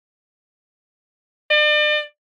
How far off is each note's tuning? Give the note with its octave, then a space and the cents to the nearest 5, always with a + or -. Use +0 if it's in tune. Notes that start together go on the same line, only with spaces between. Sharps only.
D5 +40